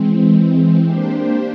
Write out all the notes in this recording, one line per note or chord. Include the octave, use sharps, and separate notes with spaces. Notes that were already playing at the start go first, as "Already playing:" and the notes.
Already playing: E3 G#3 C4
A#3 D4 G4 C5